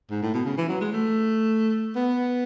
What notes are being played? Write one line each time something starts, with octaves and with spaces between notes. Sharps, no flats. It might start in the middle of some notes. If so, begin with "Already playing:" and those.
G#2
A2
B2
C#3
E3
F#3
G#3
A3
B3